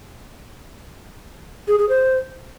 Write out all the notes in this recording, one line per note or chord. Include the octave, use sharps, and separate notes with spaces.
G#4
G#4
C5